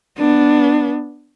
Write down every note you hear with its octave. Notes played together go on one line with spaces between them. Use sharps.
B3 D4